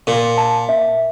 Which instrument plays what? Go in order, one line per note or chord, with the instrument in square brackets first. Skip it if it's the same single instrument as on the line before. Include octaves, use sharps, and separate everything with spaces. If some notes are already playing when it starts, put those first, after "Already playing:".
[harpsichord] A#2 [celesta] A#4
[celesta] A5
E5